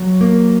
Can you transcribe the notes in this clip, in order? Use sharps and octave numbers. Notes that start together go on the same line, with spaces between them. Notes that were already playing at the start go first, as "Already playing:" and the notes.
Already playing: F#3
A#3